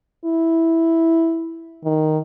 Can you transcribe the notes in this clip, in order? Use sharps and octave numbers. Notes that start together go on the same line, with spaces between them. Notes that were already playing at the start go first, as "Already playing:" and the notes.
E4
D#3